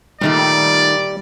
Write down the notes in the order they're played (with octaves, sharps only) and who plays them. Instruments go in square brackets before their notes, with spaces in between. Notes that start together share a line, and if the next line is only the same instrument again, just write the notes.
[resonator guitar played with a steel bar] A#2 D#3 A3 [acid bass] G3 [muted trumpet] D5